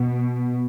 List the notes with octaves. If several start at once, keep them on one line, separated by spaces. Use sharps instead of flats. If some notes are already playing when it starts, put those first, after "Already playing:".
Already playing: B2